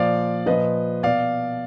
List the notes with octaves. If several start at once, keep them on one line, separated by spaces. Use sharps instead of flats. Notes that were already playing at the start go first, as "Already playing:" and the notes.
Already playing: A#2 F3 D5 F5
A#2 F3 B4 D#5
B2 D5 F5